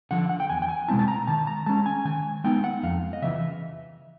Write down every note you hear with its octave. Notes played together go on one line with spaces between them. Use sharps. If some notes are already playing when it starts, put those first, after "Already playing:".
D3 F3 F#5
F#5
G5
E2 G#5
G5
G#5
B2 G#3 C4 E4 A5
A5
A#5
D#3 A5
A#5
G#3 C#4 A5
G#5
D#3 G#5
G#3 B3 D#4 G5
F#5
F2 F5
D#5
C#3 E3 E5